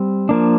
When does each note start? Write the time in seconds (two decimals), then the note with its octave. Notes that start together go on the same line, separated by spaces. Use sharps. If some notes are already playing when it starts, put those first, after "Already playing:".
Already playing: G3 C4
0.29 F3 A#3 D4